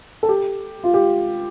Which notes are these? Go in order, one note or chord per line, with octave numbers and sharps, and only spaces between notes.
A4
G4
F4
G4